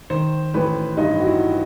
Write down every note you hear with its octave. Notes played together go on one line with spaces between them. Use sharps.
D#3 C5
A1 B4
G2 D#4
F#4
E4